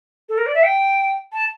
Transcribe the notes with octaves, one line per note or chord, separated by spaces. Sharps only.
A4
A#4
D5
E5
G5
A5